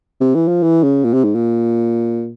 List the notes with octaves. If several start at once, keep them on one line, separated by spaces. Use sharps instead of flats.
C3
E3
F3
E3
C#3
A#2
C3
G#2
A#2